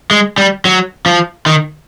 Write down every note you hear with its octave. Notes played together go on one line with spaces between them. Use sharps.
G#3
G3
F#3
F3
D#3